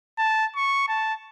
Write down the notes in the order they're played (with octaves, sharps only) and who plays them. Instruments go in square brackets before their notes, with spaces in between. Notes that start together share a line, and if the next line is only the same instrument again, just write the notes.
[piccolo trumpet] A5
C#6
A5